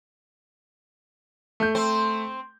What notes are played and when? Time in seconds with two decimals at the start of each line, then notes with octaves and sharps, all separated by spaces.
1.60 A3 G6
1.75 C4 C5